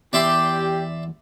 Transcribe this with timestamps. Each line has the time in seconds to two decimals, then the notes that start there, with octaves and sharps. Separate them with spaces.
0.13 E2 G4 D5 E5 C6